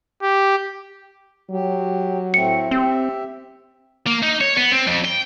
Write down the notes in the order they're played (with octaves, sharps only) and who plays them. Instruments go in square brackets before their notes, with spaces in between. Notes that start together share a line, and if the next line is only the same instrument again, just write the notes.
[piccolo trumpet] G4
[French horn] F#3 [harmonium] G4
[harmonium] A2 A3 C4 [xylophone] C#7
[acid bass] C4 [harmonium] G4 E5
[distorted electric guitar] A#3
D#4
C#5
B3
C4
F2
G5